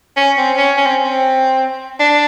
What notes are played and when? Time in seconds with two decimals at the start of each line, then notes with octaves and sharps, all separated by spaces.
0.17 C#4
0.38 C4
0.57 C#4
0.77 C#4
0.86 C4
1.04 C4
1.99 D4